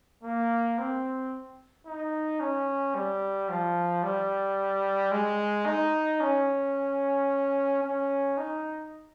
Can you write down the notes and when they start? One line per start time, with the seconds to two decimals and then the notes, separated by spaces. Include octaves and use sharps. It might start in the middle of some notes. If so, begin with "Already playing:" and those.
0.23 A#3
0.78 C4
1.86 D#4
2.40 C#4
2.95 G3
3.49 F3
4.03 G3
5.11 G#3
5.66 D#4
6.21 C#4
7.83 C#4
8.37 D#4